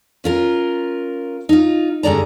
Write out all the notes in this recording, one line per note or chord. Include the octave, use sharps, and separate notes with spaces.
C#4 F4 A#4
D#4 F4
G2 D3 G#3 D5 A#5